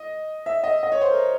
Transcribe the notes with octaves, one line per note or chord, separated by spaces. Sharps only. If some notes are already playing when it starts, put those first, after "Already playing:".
Already playing: D#5
E5
D#5
D#5
C#5
C5
A#4